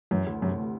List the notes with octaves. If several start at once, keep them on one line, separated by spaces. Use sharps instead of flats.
F#2 E3
D2
F#2 C3
A3